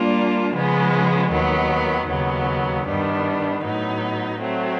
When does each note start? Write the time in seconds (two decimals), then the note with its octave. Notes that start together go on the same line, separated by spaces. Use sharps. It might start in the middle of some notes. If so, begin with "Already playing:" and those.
Already playing: G3 A#3 D4 F4
0.54 C#3 F3 G#3 B3
1.31 D#2 D#3 F#3 B3
2.08 D#2 C#3 F#3 B3
2.86 G2 D#3 G3 B3 D4
3.64 A2 F#3 B3 D#4
4.41 F#3 A3 C4